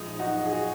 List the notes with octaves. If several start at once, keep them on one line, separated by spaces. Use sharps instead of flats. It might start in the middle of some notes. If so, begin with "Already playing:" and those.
Already playing: A#1 A#2 F3 G#3 D#4
D#4 F#4
G#4
F#4